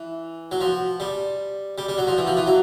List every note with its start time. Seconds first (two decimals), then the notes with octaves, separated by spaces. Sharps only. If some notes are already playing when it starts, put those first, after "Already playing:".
Already playing: E3
0.52 F#3
0.61 F3
1.00 G3
1.78 G3
1.89 G3
1.98 F#3
2.07 F3
2.18 E3
2.27 F3
2.37 E3
2.47 F#3